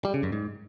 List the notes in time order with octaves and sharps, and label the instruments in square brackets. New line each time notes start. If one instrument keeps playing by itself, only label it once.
[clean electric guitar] G3
C#3
F#2
G#2